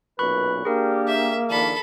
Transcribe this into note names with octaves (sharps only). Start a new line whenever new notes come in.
B1 F#2 A#2 B4 B5 C#6 F#6
A#3 D4 G4 G#4 A#4
E5
D#3 F3 D4 A4 B5